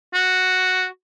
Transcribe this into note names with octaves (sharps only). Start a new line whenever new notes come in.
F#4